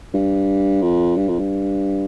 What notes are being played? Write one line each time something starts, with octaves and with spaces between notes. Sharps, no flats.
G2
F2
G2
F2
G2